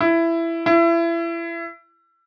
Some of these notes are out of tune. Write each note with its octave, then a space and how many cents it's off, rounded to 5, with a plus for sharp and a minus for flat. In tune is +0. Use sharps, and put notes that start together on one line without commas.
E4 +15
E4 +30